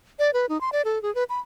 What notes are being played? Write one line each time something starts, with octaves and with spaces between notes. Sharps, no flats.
D5
B4
D#4
C6
D5
A4
G#4
B4
B5